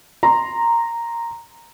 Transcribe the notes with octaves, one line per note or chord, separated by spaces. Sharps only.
A#5 C6